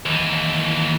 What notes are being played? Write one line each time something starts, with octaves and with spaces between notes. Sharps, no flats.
D#2 E3